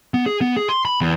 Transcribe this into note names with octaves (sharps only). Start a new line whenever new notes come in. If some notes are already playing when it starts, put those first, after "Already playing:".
B3
G#4
B3
G#4
C6
B5
E2